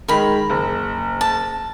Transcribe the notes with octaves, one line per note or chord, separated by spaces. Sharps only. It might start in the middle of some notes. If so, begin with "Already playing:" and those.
D#3 G#3 A#4 B5
F#1
A5